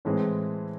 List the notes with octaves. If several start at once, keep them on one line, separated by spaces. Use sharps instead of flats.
A2 E3 G#3 C4